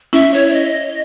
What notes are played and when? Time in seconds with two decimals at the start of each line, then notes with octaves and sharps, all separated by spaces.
0.13 C#4 E4 E5
0.34 C#5
0.48 C#5
0.53 D#5